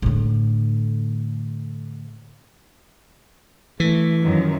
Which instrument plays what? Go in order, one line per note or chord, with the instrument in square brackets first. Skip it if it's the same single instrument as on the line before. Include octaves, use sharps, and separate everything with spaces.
[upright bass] A2 D3
[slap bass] E3 [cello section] A3
[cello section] F#2 D#3 F3